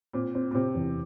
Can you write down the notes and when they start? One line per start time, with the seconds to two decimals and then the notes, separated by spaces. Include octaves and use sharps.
0.13 A#2 C4
0.35 C4
0.51 A#2
0.55 C3 C4
0.75 E2